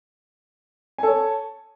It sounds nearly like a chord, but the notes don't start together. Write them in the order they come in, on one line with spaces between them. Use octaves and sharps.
G#5 A4 C#5